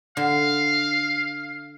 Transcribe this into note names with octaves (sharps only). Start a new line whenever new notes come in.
D3 F5